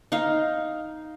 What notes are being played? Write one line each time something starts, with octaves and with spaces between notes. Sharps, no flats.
D#4 F5